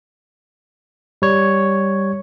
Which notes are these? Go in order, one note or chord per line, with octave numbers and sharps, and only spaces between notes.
G3 C#5